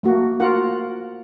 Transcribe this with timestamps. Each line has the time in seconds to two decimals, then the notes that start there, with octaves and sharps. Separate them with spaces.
0.03 A3 A#3 F#4
0.40 F4 F#4 A#4 F#5